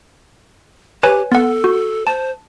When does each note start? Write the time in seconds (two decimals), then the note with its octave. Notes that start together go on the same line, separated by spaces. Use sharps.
1.03 G4 B4 C#5 G#5
1.32 B3 A4 F#5
1.64 F#4
2.07 C5 A5